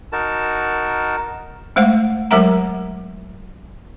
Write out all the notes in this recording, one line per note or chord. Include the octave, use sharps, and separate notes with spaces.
D#4 F#4 A#4 A5
G#3 A3 C5 F5 F#5
F#3 G#3 A#4 E5 F#5 A#5